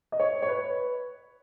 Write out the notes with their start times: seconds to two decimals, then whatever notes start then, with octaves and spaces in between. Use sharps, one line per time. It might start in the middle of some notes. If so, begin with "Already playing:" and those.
0.12 D#5
0.20 C#5
0.42 C#5
0.48 B4